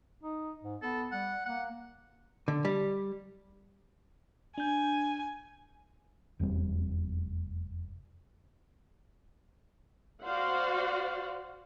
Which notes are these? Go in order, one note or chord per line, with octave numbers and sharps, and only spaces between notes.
D#4
G#2
B3 A4
G3 F#5
A#3 F#5
D3
G3
D4 G#5 G6
F1 E2 G3 C4
F#4 C5 D5 F5 F#5